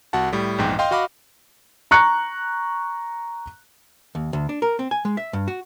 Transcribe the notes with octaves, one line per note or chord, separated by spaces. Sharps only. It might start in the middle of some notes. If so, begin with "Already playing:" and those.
C2 F#4 F#5 A5
A2 G3
A#1 E2 G#2 G5
D#5 F5 G5 C6
F#4 D#5 F5 B5 D6
A#5 C#6 F#6 C#7
D#2
D2
D4
A#4
C4
G#5
G#3
E5
G2
F#4